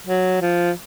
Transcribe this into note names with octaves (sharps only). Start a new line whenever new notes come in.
F#3
F3